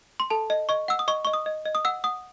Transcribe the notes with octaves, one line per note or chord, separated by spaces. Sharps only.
C6
A4 A5
D#5
D#5 C#6
F#5 E6
D#6
D#5 C#6
D#5 C#6
D#6
D#5
D#5
D#6
F#5 E6
F#5 D#6